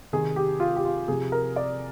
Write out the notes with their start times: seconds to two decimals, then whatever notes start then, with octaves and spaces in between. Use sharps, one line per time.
0.13 C3 D#3 G#4
0.36 G4
0.60 F4
0.76 G4
0.85 F4
1.08 C3 F3 G#4
1.32 A#4
1.56 D5